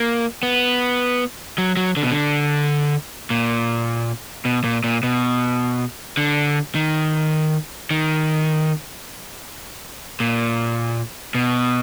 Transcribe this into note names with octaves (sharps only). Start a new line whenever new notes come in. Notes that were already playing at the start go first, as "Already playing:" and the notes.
Already playing: A#3
B3
F#3
F#3
D3
B2
D3
A#2
B2
A#2
A#2
B2
D3
D#3
D#3
A#2
B2